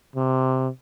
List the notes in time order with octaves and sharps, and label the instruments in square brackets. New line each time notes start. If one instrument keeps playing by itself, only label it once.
[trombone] C3